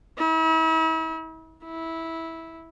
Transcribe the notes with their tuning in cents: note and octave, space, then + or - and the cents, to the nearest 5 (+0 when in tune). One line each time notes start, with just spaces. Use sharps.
E4 -40
E4 -10